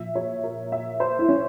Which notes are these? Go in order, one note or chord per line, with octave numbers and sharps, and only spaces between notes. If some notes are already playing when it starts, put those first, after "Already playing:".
Already playing: A#2 F3 E5
C#5
A#4
E5
C5
E4
C#4